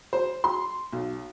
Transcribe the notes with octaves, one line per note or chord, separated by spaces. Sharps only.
C5
C6
B1